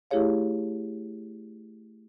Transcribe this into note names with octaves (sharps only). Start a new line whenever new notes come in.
A3 E4 G4 G#4 C#5 F5